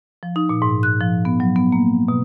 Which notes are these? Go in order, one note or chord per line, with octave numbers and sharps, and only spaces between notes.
F3
D#4
A#2
G#2
F#6
F3
B3
F#3
B3
A#3
B2